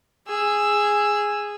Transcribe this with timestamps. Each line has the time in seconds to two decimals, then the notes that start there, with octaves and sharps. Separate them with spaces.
0.27 G#4 E6